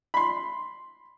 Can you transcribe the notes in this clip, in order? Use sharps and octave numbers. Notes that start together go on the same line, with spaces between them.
B5 C6